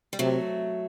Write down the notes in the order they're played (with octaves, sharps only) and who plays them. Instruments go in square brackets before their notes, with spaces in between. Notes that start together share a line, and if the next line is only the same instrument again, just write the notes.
[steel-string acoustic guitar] G3
[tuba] C3 [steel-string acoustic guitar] F#3 A3